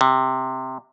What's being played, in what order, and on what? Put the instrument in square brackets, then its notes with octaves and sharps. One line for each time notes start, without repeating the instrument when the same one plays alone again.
[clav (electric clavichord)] C3